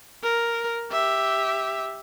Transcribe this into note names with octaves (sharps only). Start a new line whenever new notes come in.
A#4
G4 E5